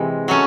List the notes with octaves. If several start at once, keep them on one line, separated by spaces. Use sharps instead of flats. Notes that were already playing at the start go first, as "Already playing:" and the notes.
Already playing: C3 E3 G#3
F#3 A3 C#4